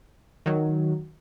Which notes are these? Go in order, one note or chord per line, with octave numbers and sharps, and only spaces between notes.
D#3 F#3